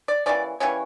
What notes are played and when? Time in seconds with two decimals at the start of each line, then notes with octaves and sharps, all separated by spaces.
0.08 D5
0.26 E3 G3 A#3 C#4 D5
0.60 E3 G3 A#3 C#4 C#5